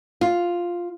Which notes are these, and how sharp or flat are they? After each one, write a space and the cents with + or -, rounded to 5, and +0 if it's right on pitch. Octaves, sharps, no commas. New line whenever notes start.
F4 +0